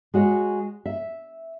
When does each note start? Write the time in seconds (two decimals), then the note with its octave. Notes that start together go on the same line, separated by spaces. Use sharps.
0.14 G#3 F#4 C#5
0.86 E5